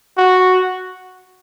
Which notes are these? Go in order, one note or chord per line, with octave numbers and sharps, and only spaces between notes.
F#4